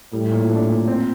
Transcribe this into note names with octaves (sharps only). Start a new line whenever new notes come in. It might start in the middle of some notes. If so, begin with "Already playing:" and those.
A2 G3
A#2
D4
A#2
C4